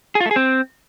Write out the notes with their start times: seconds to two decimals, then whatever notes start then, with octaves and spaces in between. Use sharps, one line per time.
0.15 G#4
0.20 F4
0.26 A3
0.31 G#4
0.36 C4